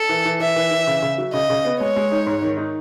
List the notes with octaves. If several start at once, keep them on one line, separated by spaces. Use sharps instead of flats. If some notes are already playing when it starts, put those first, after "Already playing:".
Already playing: A4
E3
E3
E3 E5
E3
E3
C#3
C#3
F#3
C#3 D#5
C#3
B3
G#3 C#5
G#3
D#4
G#2
D#3
D#4